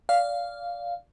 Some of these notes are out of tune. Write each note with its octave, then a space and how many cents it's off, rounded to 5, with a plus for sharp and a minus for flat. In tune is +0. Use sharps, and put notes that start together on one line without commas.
D5 -20 F5 +0